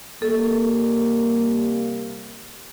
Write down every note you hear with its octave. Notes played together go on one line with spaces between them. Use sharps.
C3 G3 A#3 A4